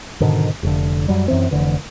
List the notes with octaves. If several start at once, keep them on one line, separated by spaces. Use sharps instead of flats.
G#2 B2 D3 D#3
F1 D3
F#2 F#3 G3
F#2 E3 C4
F1 D3 E3